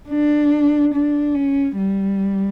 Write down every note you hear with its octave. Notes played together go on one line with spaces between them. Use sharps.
D4
D4
C#4
G3